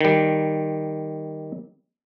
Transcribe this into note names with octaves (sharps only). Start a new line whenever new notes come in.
D#3 G3